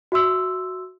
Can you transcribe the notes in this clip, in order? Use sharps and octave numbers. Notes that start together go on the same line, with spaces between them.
F#4 E5 C6 E6